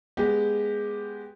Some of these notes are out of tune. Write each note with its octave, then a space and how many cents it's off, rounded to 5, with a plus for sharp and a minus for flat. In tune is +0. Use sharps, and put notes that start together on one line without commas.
G#3 +0 B3 +0 G4 +0